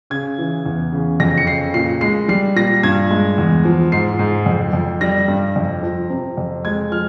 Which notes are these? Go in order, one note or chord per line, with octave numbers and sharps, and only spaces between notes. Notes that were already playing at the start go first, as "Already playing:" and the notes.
C#3 G#6
E3
E2
C#3
F2 A#6
C#7
C#3 C7
A#2 C7
G#3 C7
G3 C7
A#2 A#6
G2 G#6
G#3
E2
F3
G#2 C7
G#2
F2
F2
G3 A#6
G2
F2
F3
C3
F2
G#3 G#6
F3 F6